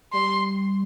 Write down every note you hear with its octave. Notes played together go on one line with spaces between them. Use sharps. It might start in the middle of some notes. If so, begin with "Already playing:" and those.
G3 C6